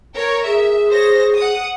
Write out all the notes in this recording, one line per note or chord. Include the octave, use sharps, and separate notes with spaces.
A#4 C#5
G#4 E5
C5 C#5 A#6
F#5 D#6